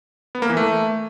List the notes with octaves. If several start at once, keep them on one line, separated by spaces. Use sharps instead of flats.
B3
A#3
E3
A3